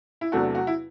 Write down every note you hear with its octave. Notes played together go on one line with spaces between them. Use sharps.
E4
E2 C3 F#3 A3 D4 F#4
F#4
E4